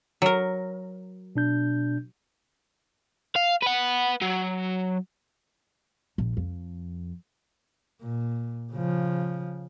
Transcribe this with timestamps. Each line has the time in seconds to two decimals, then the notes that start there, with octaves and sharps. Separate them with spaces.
0.22 F#3 A#4
1.35 B2 D4 G6
3.36 F5
3.62 B4 F#5
4.22 F#3
6.18 A#1
6.37 F2
8.02 A#2
8.73 C#3 F3